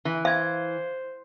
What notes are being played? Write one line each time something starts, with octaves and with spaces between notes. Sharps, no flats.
E3
C5 E5 F5 G#6